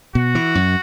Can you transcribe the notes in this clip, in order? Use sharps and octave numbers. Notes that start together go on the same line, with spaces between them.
B2 F#4
E3
F#2